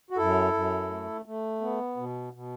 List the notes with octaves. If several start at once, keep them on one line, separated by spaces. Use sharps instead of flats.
F#4
F#2 E4 A4
F#2
A3
A3
B3
B2
B2